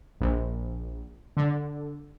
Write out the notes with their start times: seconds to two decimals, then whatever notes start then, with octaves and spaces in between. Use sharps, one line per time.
0.21 A#1
1.37 D3